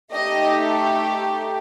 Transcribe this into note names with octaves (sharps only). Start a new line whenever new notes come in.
A3 D#4 G4 D#5